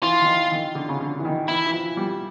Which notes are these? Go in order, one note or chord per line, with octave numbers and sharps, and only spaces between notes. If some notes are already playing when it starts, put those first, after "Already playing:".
E3 F4
D#3
E3
D#3
D3
C#3
D3
E3
D#3
E3 E4
E3
F3
G3